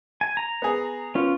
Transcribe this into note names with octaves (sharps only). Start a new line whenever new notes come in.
G#5
A#5
B3 G#4
B3 C#4 F4